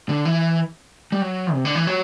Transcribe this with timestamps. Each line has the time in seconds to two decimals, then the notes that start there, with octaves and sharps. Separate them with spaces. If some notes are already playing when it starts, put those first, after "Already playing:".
0.09 D3
0.25 E3
1.12 G3
1.22 F#3
1.54 C3
1.65 D3
1.75 E3
1.87 F#3